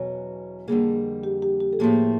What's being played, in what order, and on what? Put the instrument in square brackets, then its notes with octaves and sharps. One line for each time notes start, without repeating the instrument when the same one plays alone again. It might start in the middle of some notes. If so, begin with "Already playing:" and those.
Already playing: [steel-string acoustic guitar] E2 B2 F#3 C#4 [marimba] C#5
[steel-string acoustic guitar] F2 D3 G3 A#3 [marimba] G#4
[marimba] G4
G4
G4
A4
[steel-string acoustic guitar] A2 F3 A#3 [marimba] G#4